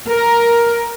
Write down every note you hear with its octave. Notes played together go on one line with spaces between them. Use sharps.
A#4